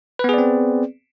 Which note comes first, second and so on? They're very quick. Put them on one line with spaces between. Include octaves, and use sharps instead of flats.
B4 B3 G#4 D5 C4